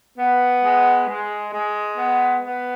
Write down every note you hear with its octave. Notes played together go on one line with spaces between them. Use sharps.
B3
G#3
G#3
G#3
B3
B3